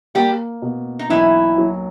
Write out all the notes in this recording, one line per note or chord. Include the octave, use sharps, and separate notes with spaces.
G3 A#3 G4
B2
D#4
B1 E3 E4
F#3